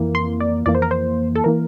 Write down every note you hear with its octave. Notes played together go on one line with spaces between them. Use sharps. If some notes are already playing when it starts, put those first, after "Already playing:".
Already playing: F2 E3 A#3
C6
D5
F2 E3 A#3 D5
C5
A#4
C5
A4
E3 A#3 A#4